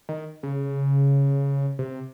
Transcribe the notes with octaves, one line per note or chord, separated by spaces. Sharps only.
D#3
C#3
C3